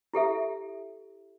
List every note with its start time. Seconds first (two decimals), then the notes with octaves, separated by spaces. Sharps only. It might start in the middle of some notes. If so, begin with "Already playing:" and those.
0.14 E4 G4 A4 E5